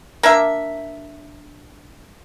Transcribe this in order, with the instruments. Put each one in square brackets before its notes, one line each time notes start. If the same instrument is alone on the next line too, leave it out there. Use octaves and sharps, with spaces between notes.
[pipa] A#3 D4 E5